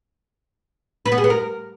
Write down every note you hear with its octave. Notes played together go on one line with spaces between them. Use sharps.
B4
B3
G#4
B3
A#4